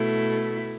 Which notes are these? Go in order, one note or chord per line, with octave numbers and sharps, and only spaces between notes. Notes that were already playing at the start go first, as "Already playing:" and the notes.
Already playing: B2 A3 E4